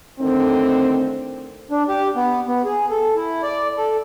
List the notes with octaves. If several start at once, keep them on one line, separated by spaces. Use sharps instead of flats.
A2 D3 D#3 C4
D4
G4
B3
B3
G#4
A4
E4
D5
A4